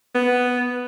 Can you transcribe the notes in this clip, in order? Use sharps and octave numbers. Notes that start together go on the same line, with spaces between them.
B3